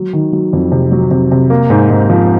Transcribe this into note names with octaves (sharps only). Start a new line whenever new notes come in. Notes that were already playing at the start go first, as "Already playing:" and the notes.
Already playing: F#3
D#3
F#3
F2
C3
F#3
C3
C3
A#3
G#2
G#2
F3